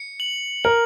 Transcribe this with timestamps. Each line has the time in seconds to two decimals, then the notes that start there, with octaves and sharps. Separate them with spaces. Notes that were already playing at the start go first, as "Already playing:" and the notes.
Already playing: C#7
0.20 F#7
0.64 A#4 F#7